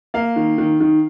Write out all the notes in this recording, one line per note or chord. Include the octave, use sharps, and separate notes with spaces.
A#3 F5
D#3
D#3
D#3